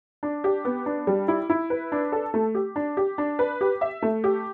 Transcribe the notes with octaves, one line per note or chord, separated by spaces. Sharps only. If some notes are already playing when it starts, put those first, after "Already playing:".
D4
G4
B3
D4
G3
E4
E4
B4
D4
A4
A3
G4
D4
G4
D4
B4
G4
E5
A3
G4